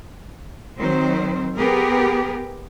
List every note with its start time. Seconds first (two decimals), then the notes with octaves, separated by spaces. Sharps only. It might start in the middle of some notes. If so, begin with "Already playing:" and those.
0.79 D#3 F#3 C4 C5
1.57 B3 G4 G#4 A#4